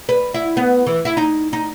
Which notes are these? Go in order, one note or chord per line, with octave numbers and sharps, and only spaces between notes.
B4
E4
B3
E3
E4
D#4
D#4